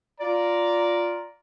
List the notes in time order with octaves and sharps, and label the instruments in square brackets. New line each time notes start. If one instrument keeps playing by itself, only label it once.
[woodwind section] F4 D5 [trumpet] A#5